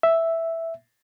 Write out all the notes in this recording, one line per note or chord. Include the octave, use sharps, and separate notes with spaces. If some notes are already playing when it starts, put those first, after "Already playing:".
E5